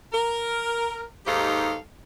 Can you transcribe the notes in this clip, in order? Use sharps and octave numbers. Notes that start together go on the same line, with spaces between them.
A#4
D#2 G#2 D#4 G4 A4 F5